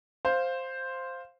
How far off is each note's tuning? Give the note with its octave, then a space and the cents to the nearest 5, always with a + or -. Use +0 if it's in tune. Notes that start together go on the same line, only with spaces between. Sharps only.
C5 +0 F5 +0